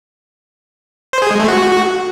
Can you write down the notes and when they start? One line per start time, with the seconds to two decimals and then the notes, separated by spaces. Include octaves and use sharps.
1.13 C5
1.22 G#4
1.31 G#3
1.39 A3
1.48 F#4